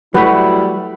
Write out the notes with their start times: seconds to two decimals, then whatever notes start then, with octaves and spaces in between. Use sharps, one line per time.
0.14 F#3 G3 A3 E4 F#4 B4